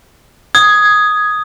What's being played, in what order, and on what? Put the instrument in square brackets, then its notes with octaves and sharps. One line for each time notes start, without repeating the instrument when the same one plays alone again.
[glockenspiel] D#6 [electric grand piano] G#6